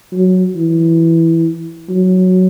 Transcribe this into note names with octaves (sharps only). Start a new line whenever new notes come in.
F#3
E3
F#3